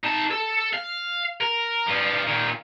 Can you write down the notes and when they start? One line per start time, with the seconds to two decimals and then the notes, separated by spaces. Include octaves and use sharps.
0.04 D#4 A5
0.31 A4
0.73 F5
1.41 A#4
1.87 G2 F3
2.27 A#2 D#3